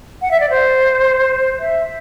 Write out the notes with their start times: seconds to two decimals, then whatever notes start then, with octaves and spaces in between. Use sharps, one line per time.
0.22 F#5
0.31 E5
0.40 D5
0.50 C5
1.59 E5